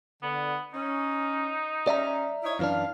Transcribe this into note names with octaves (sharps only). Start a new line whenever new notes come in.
D3 B3
C#4 D#4
G3 C#4 D5 E5 A#5
D#4 E4 C#5
F#2 E3 D4 F5